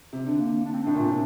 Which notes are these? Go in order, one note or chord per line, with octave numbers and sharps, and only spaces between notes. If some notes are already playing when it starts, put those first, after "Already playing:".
C3
D3 D4
A#3
A#3
D4
C4
D4
A2
A#2
C3